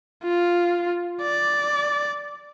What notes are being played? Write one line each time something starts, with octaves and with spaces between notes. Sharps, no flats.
F4
D5